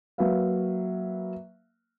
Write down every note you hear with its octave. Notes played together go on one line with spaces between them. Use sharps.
F#3 A#3 B4 E5 F5